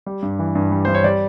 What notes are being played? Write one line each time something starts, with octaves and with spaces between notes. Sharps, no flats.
G3
G2
E3
G2
G3
G2 C5
C#5
G3 D5